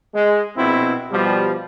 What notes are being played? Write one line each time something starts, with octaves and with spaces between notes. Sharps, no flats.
G#3
A#1 B2 C4 E4
B2 F3 G3